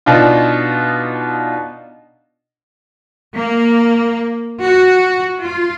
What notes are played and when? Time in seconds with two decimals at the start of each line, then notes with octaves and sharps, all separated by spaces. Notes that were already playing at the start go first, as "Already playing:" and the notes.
0.06 B2 D4 D#4 F4
3.34 A#3
4.61 F#4
5.42 F4